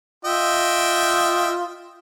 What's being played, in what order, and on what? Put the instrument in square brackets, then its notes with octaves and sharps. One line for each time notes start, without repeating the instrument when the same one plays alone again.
[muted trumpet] F4 [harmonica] D#5 E5 G5